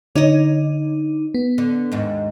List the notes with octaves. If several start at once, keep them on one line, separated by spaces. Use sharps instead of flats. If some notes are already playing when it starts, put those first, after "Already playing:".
D3 D#4 C#5 D#5
B3
D3
D#2 G#2